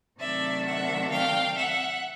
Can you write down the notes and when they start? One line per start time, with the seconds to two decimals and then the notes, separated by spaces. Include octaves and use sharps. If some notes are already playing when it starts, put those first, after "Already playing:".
0.19 C3 D#3 F#3 A3 D4 D5 E5
0.65 E5 F#5
1.11 F5 G5
1.56 E5 F#5